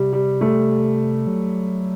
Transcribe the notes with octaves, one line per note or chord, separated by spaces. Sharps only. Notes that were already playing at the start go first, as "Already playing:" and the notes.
Already playing: C3 G3
G3
A3
F#3